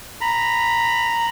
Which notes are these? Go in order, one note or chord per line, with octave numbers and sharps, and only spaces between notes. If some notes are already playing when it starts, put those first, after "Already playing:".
A#5 B5